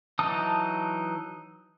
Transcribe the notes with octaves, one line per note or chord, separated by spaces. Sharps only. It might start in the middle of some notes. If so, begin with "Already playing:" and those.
E3 F#3 D#4 A5 D#6